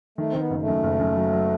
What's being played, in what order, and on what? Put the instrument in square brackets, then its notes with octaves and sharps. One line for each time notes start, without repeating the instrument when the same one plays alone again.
[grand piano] D#3 [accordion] A3
[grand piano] D#3 [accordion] C4
[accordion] B3
[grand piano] F#1
[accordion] A3
[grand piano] F#2
F#1
F#2
F#3
F#3